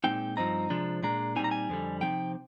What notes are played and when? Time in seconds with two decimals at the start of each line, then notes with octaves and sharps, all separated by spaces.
0.04 A#2 G#3 C4 D#4 G5
0.37 G2 F3 C4 D#4 A#5
0.70 C3 F3 G#3 D4
1.02 A#2 G#3 D4 A#5
1.36 A#2 G3 C4 D#4 G#5
1.44 A#5
1.51 G#5
1.69 F2 D3 G3
2.01 C3 F3 C4 D#4 G5